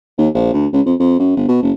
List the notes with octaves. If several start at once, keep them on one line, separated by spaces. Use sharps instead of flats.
D#2
A#1
D2
C#2
F2
F2
F#2
G1
B2
F#1